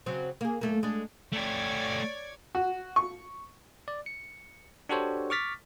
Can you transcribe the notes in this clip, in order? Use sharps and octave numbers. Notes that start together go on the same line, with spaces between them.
C#3 F#3 C4
A#3 G#4
F#2 A3 A#3
G#3 D4
A3 G4 C#5 D5 G#6
F#4
C#6
D5
C#7
D4 F#4 G4 A4 C5 C#5
C#6 D6 F6 A6 B6